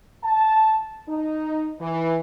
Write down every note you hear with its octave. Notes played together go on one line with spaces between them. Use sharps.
A5
D#4
E3